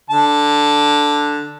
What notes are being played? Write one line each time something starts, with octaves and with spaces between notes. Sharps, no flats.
D3 A5